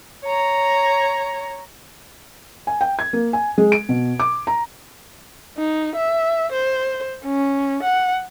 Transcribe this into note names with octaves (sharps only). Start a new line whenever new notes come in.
C#5 A#5
G#5
G5
G#6
A#3
G#5
G#3
D7
B2
D6
A#5
D#4
E5
C5
C#4
F#5